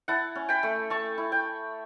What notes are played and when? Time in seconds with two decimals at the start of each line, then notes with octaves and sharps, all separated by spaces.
0.08 E4 F#5 A5
0.35 C#4
0.49 G5 B5
0.63 A3
0.90 A3 A5 C#6
1.18 E4
1.32 G5 B5